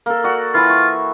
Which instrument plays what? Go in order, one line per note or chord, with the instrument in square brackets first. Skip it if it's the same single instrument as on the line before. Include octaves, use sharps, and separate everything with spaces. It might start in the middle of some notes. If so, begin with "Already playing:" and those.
[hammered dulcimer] A#3 A4
F#4 D5
[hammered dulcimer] E3 E4 [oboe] F4
[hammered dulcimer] C#6